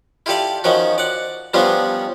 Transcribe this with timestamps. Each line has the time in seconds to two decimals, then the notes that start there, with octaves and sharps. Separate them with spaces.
0.26 E4 F4 G4 A4 D5
0.64 D#3 F3 C#4 F#4
0.98 D5 F#5
1.54 F3 G3 B3 C#4 D4 F4